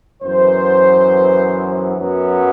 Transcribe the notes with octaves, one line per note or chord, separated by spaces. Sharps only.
F#2 E3 B3 C5
F#2 F#3 B3